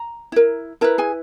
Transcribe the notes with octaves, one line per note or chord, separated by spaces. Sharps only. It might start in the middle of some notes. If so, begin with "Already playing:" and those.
Already playing: A#5
E4 A#4
E4 A#4 B4 A#5
G#4 G#5